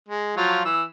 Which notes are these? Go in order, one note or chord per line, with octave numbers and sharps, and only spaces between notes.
G#3
F3 F#3 F4
E3 E6